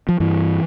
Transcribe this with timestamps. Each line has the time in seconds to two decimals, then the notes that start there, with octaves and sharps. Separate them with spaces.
0.09 F3
0.20 G2 E3